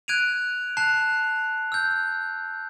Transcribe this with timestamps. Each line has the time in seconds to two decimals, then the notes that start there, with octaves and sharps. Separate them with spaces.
0.08 F#6 G#6 D7 D#7 F7
0.77 A5 F#6 C7 F7
1.72 E6 G6